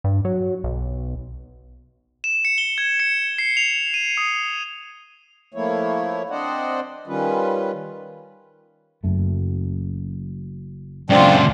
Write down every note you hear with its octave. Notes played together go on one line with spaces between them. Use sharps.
G2
F#3
B1
E7
C#7
G7
G#6
C#7
C7
F7
D#7
D#6
F3 A3 A#3 E4 C#5
C4 D4 C5 D5 D#5 F#5
D#3 G3 C#4 F4 B4
F#1 F#2 A3
C#2 F#2 A3 C4 D4 F4